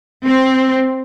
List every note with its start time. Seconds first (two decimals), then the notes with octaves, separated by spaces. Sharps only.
0.25 C4